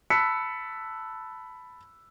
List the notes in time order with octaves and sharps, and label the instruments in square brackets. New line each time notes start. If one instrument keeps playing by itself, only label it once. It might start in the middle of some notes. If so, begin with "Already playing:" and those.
[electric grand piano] A5 B5 E6 F#6 B6 C#7